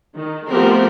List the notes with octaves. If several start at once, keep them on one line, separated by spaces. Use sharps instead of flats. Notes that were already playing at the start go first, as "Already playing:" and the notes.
D#3
F3 A3 B3 C4 G4 A#4